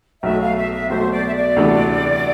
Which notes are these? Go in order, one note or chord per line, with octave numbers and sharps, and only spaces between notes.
B1 B2 A3 E5
F5
E5
E5
B1 B2 A3 C5
D5
E5
D5
D2 C3 E3 A3 D4